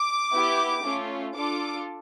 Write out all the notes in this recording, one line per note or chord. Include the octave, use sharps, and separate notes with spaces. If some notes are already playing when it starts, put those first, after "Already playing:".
Already playing: D6
B3 E4 G4
A3 C#4 F4
D4 F4 A4 D6